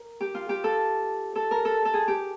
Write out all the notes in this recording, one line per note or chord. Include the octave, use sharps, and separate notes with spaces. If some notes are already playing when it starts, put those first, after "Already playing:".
Already playing: A#4
G4
F4
G4
A4
A4
A#4
A4
A4
G#4
G4